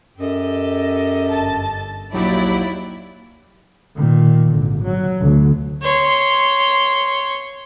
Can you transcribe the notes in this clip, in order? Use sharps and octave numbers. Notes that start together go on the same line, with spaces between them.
F#2 G4 A4 D#5
G1 A5 A6
A#1 D#2 F#3 D#4 E4 G4 C#5 D5
A#2 D#3
G#1 D3
F#3
D2
C#5 C6